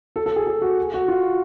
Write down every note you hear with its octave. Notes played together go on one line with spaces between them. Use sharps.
A4
A4
G#4
G#4
F#4
F#4
F4